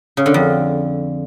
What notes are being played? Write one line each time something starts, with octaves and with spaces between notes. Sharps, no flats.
C#3
D3
F2